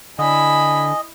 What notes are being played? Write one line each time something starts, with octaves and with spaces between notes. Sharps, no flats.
D3 E4 D#5 G#5 B5